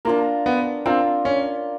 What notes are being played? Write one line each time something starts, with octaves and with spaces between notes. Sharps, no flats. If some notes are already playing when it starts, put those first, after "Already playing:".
A#3 D4 F4 A#4
B3
C4 D4 F4 A#4
C#4